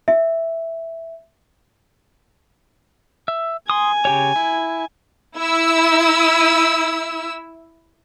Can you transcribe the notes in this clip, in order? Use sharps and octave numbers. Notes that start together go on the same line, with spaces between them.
E5
E5
G#5 C6 D#6
C#3 G4 C#5
E4
E4 E6